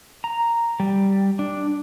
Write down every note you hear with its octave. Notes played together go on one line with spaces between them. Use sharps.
A#5
G3
D4